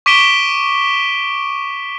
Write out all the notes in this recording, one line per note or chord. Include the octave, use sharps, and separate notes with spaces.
C#6 D6 B6 D7 E7 G7